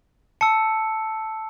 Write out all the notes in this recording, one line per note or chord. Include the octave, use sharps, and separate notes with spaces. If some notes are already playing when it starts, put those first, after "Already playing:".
A5 E6 C#7